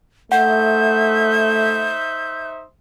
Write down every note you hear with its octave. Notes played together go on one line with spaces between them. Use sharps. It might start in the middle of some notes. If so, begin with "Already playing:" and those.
A3 D#4 C5 E5 F#5 G6